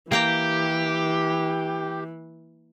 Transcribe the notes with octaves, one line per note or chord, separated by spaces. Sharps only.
E3 A#3 G4 G5 A#5